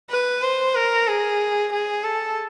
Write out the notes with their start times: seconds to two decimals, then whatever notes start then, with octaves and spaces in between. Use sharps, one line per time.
0.10 B4
0.43 C5
0.75 A#4
1.07 G#4
1.72 G#4
2.04 A4